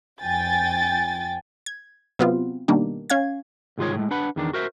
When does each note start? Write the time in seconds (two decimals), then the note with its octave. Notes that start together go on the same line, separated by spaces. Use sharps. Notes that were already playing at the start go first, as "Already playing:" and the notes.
0.22 F2 G5 G#5 A6
1.66 G#6
2.19 C3 F#3 B3 C4 F4
2.68 B2 D#3 G3 A#3 D4
3.10 C#4 F5 G#6
3.78 C2 G#2 D#3 F4 G#4 C#5
3.95 A2 G#3
4.11 D4 B4 F#5 B5
4.36 E2 D#3 D4
4.53 F#4 A#4 C5 E5